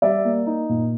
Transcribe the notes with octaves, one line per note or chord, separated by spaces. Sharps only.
G3 D5 E5
A#3
D#4
A#2